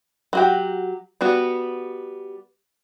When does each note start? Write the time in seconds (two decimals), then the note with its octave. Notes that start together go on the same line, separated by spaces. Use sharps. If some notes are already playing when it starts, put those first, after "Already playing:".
0.33 F#3 F#4 G4
1.21 G3 B3 F#4